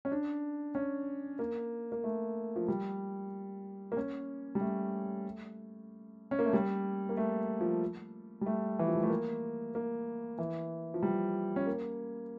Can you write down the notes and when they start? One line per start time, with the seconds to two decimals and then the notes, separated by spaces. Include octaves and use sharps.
0.05 C#4
0.12 D4
0.75 C#4
1.39 A#3
1.92 A#3
2.04 A3
2.56 F3
2.68 G3
3.92 A#3
3.97 C#4
4.55 G3
4.61 A3
6.31 C#4
6.39 A#3
6.46 A3
6.53 G3
7.09 A#3
7.17 A3
7.61 F3
8.41 G3
8.46 A3
8.79 E3
8.87 F3
8.95 G3
9.03 A3
9.10 A#3
9.75 A#3
10.38 E3
10.94 F3
11.03 G3
11.56 C#4
11.66 A#3